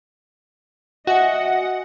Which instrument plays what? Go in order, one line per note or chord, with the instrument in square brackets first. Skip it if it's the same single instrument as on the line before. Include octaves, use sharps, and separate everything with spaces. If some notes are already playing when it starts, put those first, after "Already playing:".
[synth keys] F#4 [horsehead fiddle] D#5 [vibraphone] E5 G#5 [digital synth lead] F#5